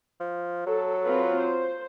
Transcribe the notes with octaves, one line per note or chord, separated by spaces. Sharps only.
F3
F#3 A4
C4 F4 B4
C5